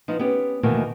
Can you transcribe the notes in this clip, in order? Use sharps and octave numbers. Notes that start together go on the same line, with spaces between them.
F3 B3 D#4
B3 C#4 G4
D#2 B2 D#3 E3 A3 A#3